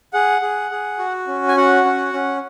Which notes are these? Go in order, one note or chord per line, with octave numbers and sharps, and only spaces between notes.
G#4 F#5
G#4
G#4
F#4
C#4
G#5
F#4 F#5
C#4
C#4